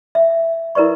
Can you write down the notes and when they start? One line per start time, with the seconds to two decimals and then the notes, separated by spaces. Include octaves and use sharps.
0.15 E5
0.75 E4 A#4 B4 D5 C#6